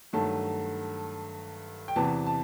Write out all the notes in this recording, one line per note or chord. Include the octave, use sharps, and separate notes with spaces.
G2 D#3 F#3 A3 A5
G5
E2 C3 E3 B3 A5
A5